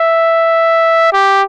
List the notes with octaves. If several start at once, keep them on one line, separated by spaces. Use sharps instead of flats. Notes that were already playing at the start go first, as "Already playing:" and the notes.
Already playing: E5
G4